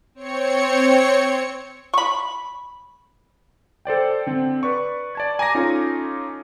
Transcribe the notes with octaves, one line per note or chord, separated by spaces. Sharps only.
C4 C#5 C#7
B5 C#6
A4 C5 D5 G5
D3 C4
B4 D5 C#6
D5 A5 G#6
G#5 A#5 D6 A#6
C#4 D#4 F4 A4